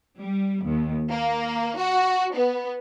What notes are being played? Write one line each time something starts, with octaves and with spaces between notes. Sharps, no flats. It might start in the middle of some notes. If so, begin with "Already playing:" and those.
G3
D#2
A#3
F#4
B3